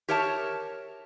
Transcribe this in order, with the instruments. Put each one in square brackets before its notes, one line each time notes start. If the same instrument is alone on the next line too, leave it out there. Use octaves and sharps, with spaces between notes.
[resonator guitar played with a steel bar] G4 A#4 C#5 E5 A5